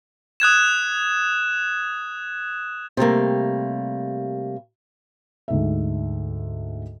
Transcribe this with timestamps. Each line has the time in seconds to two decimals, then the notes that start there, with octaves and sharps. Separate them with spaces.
0.40 D#6 F#6 G#6 E7
2.97 C3 G3 A3 A#3
5.48 D2 G#2 E5